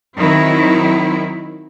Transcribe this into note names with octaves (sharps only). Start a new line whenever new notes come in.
D#3 F#3 C4 E4